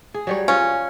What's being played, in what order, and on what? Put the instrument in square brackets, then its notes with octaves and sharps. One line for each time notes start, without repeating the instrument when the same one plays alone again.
[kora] G#4
F#3 G3 C#5
[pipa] C#4 [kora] F4